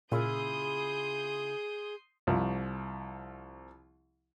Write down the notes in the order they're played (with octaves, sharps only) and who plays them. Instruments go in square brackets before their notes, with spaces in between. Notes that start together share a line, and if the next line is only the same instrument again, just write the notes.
[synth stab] A#2 [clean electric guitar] C#3 E4 F4 [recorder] G#4 [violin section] C6 D#6 G6
[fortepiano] C2 F3